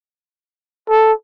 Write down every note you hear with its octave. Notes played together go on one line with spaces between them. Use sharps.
A4